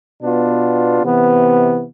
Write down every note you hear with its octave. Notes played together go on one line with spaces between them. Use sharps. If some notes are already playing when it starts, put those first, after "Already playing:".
B2 B3 D4 F4
C3 E3 B3